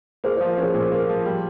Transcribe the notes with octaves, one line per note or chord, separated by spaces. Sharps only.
A#3 G#4 C5
F3 G#4 C5
C#4 G#4 C5
A#2
A#3
F3
G3